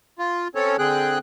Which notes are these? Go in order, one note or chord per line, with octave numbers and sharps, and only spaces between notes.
F4
C4 C#4 A4 C#5
D3 C4 G#4 G5 F#6